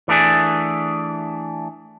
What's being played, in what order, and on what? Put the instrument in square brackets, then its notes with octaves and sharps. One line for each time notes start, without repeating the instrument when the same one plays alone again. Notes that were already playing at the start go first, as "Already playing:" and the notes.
[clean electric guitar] E3 A3 D4 G#4